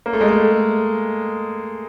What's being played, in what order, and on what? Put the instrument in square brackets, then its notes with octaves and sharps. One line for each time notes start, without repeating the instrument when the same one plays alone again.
[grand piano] A#3
A3
G#3
A3